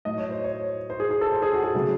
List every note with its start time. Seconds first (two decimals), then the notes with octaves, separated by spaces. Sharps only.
0.05 A2 F#3 A3 D#5
0.18 C#5
0.31 C5
0.44 C#5
0.90 C5
1.00 G#4
1.11 G#4
1.21 A4
1.32 C5
1.42 G#4
1.53 F#4
1.64 G#4
1.74 C#3 F#3 A3 C4